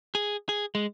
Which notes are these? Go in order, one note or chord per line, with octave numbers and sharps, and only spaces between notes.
G#4
G#4
G#3